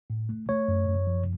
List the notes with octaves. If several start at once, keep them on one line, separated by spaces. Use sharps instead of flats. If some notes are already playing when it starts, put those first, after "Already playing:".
A2
A3
A3 C#5
F#2
F#2
F3